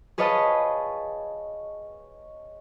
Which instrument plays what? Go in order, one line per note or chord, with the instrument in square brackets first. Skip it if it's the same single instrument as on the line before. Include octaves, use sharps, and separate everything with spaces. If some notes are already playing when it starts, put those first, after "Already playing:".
[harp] G#4 B4 C#5 D#5 F5 A5